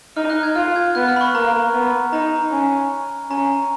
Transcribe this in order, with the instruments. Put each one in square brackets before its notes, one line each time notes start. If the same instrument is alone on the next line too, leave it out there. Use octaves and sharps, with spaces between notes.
[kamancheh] D#4 [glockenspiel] F6
[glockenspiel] F#6
G#6
[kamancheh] F4 [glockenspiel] F6
[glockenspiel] G#6
[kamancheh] B3 [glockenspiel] F#6
[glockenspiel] F6
B5
C#6
[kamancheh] A#3 [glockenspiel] A#5
[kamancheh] B3
[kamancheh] D#4 [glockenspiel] A#5
[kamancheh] C#4
[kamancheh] C#4 [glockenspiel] A#5